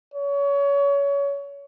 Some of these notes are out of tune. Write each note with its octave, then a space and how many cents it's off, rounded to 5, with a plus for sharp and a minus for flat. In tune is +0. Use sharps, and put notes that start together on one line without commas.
C#5 +25